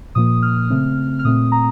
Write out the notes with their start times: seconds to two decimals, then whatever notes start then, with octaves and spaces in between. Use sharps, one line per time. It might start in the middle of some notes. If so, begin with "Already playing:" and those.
0.15 A#2 F3 A#3 D#6
0.42 F6
0.70 C#3 A3 C4
1.19 F6
1.25 A#2 A3 C4 D#6
1.52 A#5